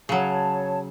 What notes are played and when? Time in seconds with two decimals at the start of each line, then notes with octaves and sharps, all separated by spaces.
0.09 C#3 F#3 C#5 A5